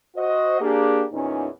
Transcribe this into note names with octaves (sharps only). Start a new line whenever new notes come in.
F#4 C5 D#5
A#3 D4 G4 G#4
E2 A#2 C#4 D#4